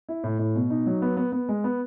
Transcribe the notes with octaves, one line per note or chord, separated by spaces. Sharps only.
E4
A2
A2
B2
D#4
F#3
B3
B3
B3
G#3
B3